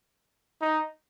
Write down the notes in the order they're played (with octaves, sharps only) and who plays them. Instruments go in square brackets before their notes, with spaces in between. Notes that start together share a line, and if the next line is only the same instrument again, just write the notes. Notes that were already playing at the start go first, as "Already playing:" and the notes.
[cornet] D#4